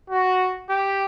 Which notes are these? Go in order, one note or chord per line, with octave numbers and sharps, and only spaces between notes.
F#4
G4